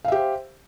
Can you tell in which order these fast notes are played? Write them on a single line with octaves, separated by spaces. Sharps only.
F5 E5 G4 C5